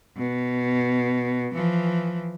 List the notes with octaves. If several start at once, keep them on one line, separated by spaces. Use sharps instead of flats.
B2
E3 F3